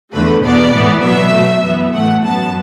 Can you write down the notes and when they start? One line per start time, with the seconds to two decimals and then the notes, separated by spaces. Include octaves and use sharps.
0.13 E2 D3 A3 B4
0.44 E2 B2 B3 D5
0.73 A2 E3 B3
1.03 B2 F#3 B3 E5
1.33 B2 A3
1.65 F#2 E3 B3
1.94 A2 E3 A3 F#5
2.24 F#2 F#3 B3 A5